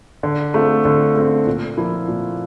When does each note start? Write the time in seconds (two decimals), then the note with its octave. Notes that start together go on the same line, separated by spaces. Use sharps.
0.23 D3
0.54 A3 C4 F4
0.85 D3
1.16 A3 C4 F4
1.47 A#2
1.77 F3 A#3 E4
2.08 A#2